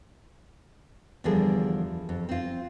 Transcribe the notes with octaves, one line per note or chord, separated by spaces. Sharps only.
E2 D3 F3 G3 G#4 A#4
F2
C4 F4